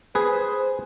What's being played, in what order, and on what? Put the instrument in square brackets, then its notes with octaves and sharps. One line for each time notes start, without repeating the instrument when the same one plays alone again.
[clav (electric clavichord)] G#4 B4 [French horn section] C5